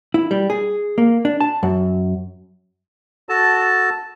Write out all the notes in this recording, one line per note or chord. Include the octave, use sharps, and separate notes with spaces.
E4
G3
G#4
A#3
D4
A5
F#2
F#4 A4 A5